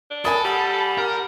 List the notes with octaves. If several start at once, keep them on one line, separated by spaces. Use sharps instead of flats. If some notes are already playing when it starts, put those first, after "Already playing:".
D4
A4 A#4 G#5 B5 D#6
G3 F#5
A#4